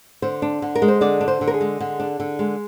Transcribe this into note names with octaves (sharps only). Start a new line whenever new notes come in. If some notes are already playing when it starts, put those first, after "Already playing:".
D3 C5
D4
D3
A#4
G#3
C5
D3 D5
D4
C5
D3
A#4
G#4
G#3
D3
D4
D3
G#3